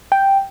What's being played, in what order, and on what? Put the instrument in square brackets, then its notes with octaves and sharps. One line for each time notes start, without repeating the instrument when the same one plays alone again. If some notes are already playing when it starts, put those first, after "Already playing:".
[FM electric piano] G5